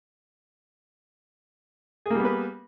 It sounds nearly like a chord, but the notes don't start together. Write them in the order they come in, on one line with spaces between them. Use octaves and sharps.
G#4 A#3 G3 B3 B4